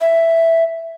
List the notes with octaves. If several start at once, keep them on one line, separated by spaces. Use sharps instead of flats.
E5